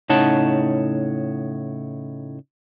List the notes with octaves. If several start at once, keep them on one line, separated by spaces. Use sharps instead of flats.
A2 C#3 D#4 C#5 F#5 A5